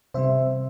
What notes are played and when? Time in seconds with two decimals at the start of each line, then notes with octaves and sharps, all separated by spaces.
0.14 C3 G3 C4 C5 E5